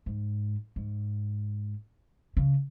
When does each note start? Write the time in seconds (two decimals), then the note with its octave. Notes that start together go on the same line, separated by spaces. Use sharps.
0.06 G#2
0.76 G#2
2.37 C#3